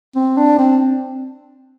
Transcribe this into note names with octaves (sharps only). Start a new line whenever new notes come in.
C4
D4
C4